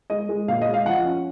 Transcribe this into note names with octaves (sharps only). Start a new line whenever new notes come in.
G#3 D#5
G#3
A#2 F5
D#5
G#3
F5
F3 F#5
C#4